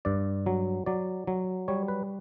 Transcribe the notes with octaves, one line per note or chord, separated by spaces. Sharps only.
G2 D5
F#3
F#3 D5
F#3
G3 C#5
B4